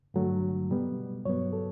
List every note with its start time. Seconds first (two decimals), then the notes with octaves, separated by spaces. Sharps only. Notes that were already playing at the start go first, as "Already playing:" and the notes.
0.14 G2 D3 F#3 A3
0.70 B2 G3 B3
1.25 G2 F#3 B3 C#5
1.53 A4